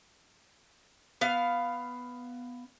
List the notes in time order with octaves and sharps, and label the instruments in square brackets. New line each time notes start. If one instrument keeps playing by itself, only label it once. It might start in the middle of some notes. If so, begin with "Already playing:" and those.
[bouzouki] B3 F5